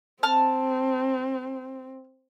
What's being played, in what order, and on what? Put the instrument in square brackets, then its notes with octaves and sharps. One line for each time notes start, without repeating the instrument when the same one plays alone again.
[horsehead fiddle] C4 [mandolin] A5 F6